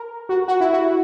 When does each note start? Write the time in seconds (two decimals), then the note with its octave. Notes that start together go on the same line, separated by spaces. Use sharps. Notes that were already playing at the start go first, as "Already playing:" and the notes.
Already playing: A#4
0.29 F#4
0.48 F#4
0.60 E4
0.73 F#4